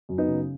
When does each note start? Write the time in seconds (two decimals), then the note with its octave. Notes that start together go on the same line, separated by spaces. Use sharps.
0.09 F#2
0.18 B3 D#4
0.28 C#3